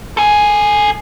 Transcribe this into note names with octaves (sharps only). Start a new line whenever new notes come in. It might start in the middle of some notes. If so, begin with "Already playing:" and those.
A4 G#5